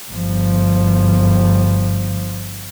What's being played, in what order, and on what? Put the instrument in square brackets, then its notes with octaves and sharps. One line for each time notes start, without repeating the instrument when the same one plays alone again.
[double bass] G1 F3